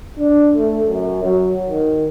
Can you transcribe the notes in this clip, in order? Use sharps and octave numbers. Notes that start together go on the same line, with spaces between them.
D4
A3
F#2
F#3
D#3